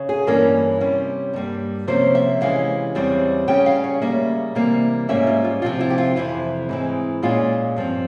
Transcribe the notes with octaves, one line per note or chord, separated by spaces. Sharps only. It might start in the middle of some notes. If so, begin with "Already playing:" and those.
Already playing: C#3
G#4
G2 E3 A#3 C#4 A#4
C3 G3 C#4
G2 G3 A#3
C3 F3 A#3 C#4 C5
E5
C3 E3 G#3 C#4 F5
E2 C#3 G3 C4
C#3 G3 C#4 G5
F5
C#5
C#3 G3 A#3 E5
C3 E3 G3 A#3
G#2 G3 A#3 C#4 E5
F4
F4
C3 F3 C4 F4
E4
G4
F4
F2 C3 E3 E4
G#2 E3 G#3 C4
A#2 G#3 C#4 F4
G2 F3 C4